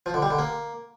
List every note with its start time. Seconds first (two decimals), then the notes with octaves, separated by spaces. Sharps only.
0.06 F3
0.14 D3
0.22 G3
0.31 D3
0.39 A#3